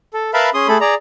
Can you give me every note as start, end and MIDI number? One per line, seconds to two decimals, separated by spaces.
0.14 0.31 69
0.34 0.50 70
0.34 0.50 71
0.34 0.50 76
0.34 0.50 77
0.34 0.50 81
0.34 0.50 83
0.54 0.68 61
0.54 0.68 68
0.54 0.68 84
0.54 0.68 87
0.68 0.78 57
0.68 0.78 68
0.68 0.78 69
0.68 0.78 83
0.81 0.94 68
0.81 0.94 74
0.81 0.94 82